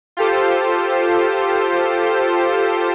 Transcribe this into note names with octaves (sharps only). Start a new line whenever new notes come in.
F4 G4 A4 C5